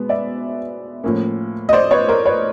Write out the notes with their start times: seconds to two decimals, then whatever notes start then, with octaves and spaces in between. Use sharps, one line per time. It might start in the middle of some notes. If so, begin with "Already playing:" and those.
Already playing: B2 G#3 B3
0.09 D5 E5
1.03 A2 F3 A#3 C#4
1.69 D#5
1.73 C5 D5
1.91 B4 C#5
2.08 A#4 C5
2.26 B4 C#5